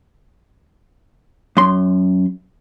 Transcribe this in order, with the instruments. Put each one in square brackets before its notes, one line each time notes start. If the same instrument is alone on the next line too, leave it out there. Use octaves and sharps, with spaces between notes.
[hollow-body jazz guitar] F#2 C6